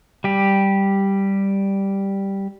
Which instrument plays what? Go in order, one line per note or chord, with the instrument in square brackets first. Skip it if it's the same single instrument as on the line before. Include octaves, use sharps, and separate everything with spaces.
[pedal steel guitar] G3 G4